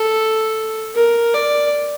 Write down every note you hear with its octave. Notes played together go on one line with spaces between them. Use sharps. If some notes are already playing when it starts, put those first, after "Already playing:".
Already playing: A4
A#4
D5